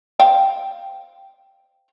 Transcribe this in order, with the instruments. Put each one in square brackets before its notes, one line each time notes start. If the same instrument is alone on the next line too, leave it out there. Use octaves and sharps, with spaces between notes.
[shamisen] C5 F5 G5